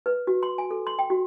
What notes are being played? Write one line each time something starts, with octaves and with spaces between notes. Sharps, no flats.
B4
F#4
C6
G#5
A4
C6
G5
F#4